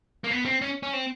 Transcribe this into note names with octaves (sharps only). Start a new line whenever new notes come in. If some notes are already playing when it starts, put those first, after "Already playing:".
A#3
B3
C4
C#4
C#4
C4